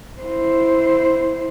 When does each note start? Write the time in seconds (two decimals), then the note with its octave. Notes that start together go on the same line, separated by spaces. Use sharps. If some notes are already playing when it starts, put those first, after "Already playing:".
0.22 E4 C5